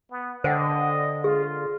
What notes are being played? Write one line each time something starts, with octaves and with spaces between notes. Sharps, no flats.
B3
D3 C5 D#5 F#5 G5
F4 G#4